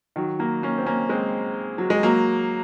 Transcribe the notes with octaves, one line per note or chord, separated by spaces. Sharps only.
D#3 F#3
F#3 A#3
A#3 C#4
C4
A#3 C#4
G#3 C4
F#3
G#3
F#3 A#3